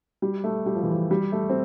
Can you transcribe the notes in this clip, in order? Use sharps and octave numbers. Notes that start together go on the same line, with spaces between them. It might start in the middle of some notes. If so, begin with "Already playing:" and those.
G3
A3
G3
F3
E3
F3
G3
A3
C4